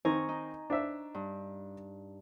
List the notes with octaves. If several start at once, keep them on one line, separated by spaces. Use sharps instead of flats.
D#3 C4 G#5 A#5 C#6
D#4
D4 C5 E5
G2